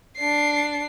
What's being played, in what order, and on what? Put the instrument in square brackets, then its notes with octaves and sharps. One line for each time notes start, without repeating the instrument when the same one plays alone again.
[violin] D4 C7